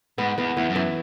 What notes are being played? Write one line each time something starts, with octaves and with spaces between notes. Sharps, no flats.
G#2 B3
E2 B3
E2 E3
F#2
E3